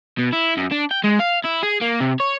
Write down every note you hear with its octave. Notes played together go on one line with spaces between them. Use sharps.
B2
E4
F#2
D4
G5
G#3
F5
E4
G#4
A#3
C3
C#5